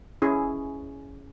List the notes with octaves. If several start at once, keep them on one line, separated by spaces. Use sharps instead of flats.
C#4 E4 G#4